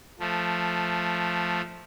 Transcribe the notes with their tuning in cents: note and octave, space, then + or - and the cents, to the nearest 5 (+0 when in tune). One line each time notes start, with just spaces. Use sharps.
F3 +0 A3 +0